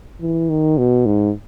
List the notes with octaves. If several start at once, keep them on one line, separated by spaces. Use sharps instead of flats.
E3
D#3
B2
G#2